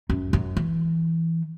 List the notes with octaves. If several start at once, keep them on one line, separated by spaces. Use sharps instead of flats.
F#2
F#2
E3